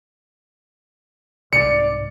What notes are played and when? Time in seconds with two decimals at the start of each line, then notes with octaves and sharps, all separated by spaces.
1.53 C2 G#2 D5 C#7